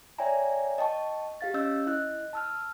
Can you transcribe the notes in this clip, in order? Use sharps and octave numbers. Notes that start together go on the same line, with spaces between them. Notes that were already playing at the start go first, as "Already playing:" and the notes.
C#5 D5 E5 G5 G#5 A#5
D#5 G5 A5 C#6
G4 F5 A6
C#4 D#5 E6 G6
E4 D#5 F#6
A5 E6 F6